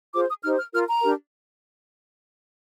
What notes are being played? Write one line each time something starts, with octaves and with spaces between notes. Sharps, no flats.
F4 G#4 C5 D6
D#6
D#4 G4 C5 F6
F6
F4 A#4 F6
A#5
D4 G4 A#4